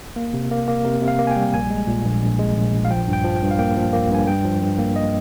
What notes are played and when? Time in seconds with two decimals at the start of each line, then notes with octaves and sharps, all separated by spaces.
0.16 A#3
0.34 C3
0.51 A#3
0.68 A#3
0.85 C3 A#4
1.02 C3
1.08 F5
1.19 A#3
1.27 G#5
1.31 G5
1.36 G3
1.53 A#1 G#5
1.70 G#3
1.87 A#2
2.04 A#1
2.22 A#1
2.39 G#3
2.56 A#1
2.73 A#1
2.85 F5
2.90 F3 G5
3.07 G2
3.13 G5
3.24 F3
3.36 G5
3.42 G2
3.51 F5
3.59 A#3 G5
3.77 F3
3.93 A#3
4.11 G2 G#5
4.27 G2 G5
4.45 F3
4.62 G2
4.78 A#3
4.96 D#5